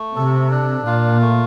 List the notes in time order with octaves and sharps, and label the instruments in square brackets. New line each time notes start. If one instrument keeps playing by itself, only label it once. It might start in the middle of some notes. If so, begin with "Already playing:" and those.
Already playing: [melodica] A3
[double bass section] C3 [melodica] A4
[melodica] D4
[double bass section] A#2 [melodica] F4
[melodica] A3